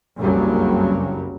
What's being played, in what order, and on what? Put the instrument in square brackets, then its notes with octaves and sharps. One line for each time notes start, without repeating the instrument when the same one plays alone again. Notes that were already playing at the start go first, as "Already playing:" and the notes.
[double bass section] F#1 C2 G2 C#3 F#3 G3